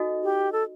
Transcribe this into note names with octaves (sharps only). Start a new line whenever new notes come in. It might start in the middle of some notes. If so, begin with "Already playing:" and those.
Already playing: D#4 F#4 A4 D#5
G4
A4